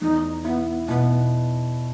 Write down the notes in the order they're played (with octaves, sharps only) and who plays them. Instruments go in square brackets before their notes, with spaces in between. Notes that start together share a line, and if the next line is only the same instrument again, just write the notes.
[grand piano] E2 [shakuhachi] D#4
[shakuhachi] B3 [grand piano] E4
[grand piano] B2 [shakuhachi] B3